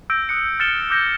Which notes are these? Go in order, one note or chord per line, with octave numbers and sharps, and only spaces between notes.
E6 G6 A#6 D7
D#6 F#6 C#7
F6 A6 C#7 E7 G7
D6 E6 G6 A#6 E7